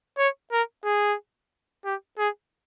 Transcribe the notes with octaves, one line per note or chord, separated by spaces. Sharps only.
C#5
A#4
G#4
G4
G#4